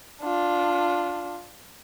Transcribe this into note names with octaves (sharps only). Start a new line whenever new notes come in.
D4 F4